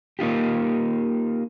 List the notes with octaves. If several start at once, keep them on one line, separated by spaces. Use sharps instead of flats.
A#3 D#4 F4 G4